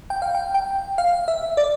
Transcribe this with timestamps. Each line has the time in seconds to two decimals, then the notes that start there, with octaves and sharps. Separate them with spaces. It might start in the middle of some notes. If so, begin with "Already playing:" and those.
0.10 G5
0.22 F5
0.35 G5
0.54 G5
0.98 F5
1.28 E5
1.57 D5